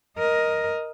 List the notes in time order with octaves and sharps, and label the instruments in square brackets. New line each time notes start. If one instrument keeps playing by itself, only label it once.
[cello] A#4 D#5